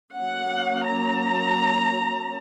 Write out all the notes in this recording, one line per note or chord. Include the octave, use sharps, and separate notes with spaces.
F#3 A#3 C#4 F#5
A#5